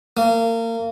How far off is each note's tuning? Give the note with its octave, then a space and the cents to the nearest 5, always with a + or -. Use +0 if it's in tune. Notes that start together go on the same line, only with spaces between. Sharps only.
A#3 -30